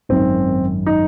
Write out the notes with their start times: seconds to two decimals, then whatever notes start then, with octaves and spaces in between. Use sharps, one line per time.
0.09 G#1 F#2 D#3 C4
0.86 D#4